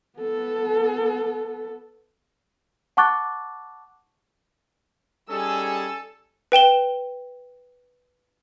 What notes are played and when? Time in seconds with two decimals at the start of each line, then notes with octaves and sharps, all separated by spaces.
0.19 B3 A4
2.97 F#5 A5 C#6 D6 F#6 A6
5.30 G3 C#4 D#4 G#4 A4 G#5 E6
6.52 B4 G5 E7 G7